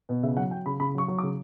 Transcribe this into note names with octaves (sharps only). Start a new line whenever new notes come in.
B2
C#3 E5
F#3 F#5
F#3 G5
C#3 B5
C#3 B5
F#3 C#6
F#3
C#3 D6